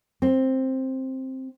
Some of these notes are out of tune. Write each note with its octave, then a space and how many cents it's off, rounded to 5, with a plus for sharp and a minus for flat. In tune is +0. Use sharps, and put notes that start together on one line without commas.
C4 +10